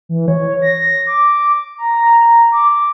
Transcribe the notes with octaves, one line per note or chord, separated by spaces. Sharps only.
E3
C#5
A#6
D6
A#5
D6
D6